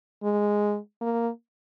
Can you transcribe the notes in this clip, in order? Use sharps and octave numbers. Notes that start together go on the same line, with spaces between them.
G#3
A#3